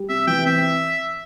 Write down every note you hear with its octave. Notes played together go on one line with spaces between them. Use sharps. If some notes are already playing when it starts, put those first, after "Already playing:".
Already playing: G3
C3 E5
E3 G5
C4 E5